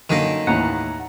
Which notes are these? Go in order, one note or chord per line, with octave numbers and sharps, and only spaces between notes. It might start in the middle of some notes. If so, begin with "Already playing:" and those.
F#2 D3 D#3 A#3
D#2 A2 E3 F#5 A#5